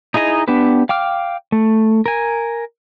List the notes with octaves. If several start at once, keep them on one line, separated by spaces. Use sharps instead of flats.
D#4 E4 G#4 D#5 A#5
B3 D4 G4 B4
F5 G5 D6 F6
A3
A#4 G#5